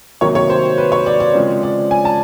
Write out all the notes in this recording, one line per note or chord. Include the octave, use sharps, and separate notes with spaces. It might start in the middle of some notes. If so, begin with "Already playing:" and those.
C3 D#3 F#3 A#3 C#5
C#5
C5
B4
C#5
D5
D5
C#3 F3 G#3 C4
D5
G#5
A5